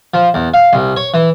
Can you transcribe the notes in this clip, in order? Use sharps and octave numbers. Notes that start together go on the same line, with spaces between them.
F3
E2
F5
C2
C#5
E3